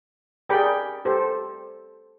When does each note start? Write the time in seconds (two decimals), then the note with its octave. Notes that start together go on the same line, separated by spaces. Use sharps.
0.49 G4 G#4 A#4 D5 G5 B5
1.05 G4 A4 C5